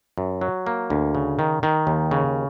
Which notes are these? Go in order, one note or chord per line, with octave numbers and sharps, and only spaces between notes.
F#2
F#3
A#3
D2
C#3
D#3
D#3
D#2
C#3